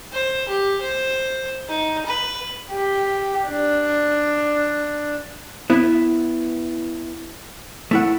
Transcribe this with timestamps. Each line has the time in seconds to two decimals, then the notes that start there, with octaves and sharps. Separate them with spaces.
0.12 C5
0.48 G4
0.81 C5
1.68 D#4
2.06 B4
2.72 G4
3.48 D4
5.70 B3 E4
7.91 A3 E4 F#5